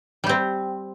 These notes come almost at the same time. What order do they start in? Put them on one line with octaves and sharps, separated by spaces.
G3 G4 C4